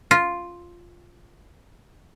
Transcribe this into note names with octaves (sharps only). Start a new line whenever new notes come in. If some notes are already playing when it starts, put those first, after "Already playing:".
F4